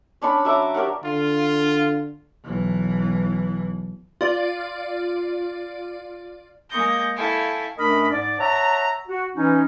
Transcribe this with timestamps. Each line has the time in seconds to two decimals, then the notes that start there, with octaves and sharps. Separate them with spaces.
0.22 C#4 D4 C#5 B5
0.45 F#3 E5 A#5 D6
0.74 G4 A#4 C#5 F#5
1.04 D3 F4
2.45 B1 E3
4.21 F4 D5
6.69 G#3 A#3 C#6 D#6 G6 A#6
7.16 E4 A4 F5 G5 G#5 C#6
7.78 F#2 A3 D4 A#4 D#5 B5
8.10 G#2 D5
8.40 C#5 E5 F#5 A5 A#5
9.07 F#4
9.35 E3 C#4 D#4